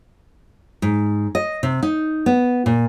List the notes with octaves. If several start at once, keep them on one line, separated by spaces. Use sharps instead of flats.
G#2
D#5
C3
D#4
B3
A#2